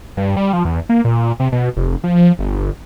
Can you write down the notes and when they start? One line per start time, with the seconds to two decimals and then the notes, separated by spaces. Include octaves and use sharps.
0.17 G2
0.37 G3
0.53 F3
0.65 E2
0.89 A#3
1.04 A#2
1.40 C3
1.52 B2
1.77 F1
2.04 F3
2.39 G1